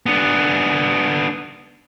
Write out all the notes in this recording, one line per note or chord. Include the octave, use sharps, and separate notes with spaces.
B3 D4